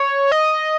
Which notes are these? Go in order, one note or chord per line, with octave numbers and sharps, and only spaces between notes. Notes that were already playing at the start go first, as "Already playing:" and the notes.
Already playing: C#5
D#5